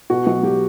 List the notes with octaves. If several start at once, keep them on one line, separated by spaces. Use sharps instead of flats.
B2 F#4
B1 F#4
F#3 G4